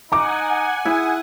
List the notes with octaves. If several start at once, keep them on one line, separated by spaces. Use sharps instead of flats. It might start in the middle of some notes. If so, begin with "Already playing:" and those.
D#4 F#5 G#5 A#5 D6
E4 G#4